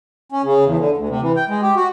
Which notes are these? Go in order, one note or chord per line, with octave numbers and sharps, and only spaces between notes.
C#4
C#3
E2
D3
D2
C3
E3
G5
G#3
G4
F#4